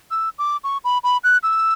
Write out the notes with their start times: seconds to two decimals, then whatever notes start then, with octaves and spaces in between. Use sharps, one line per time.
0.11 E6
0.39 D6
0.64 C#6
0.84 B5
1.04 B5
1.24 F#6
1.43 E6